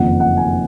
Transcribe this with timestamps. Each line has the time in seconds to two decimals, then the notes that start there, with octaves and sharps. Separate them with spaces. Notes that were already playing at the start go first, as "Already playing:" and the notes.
Already playing: F#1 F2 D#3 F#5
0.20 F#5
0.37 G#5